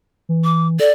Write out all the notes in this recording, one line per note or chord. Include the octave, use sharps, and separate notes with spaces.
E3
D6
A4 D5